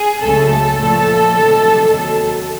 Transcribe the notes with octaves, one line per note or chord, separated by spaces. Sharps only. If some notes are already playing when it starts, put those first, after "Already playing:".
Already playing: G#4
C#2 C#3 F#3 A3 A4
A#2 F3 A3
D2 C3 D#3 F#3
D#2 D#3 F#3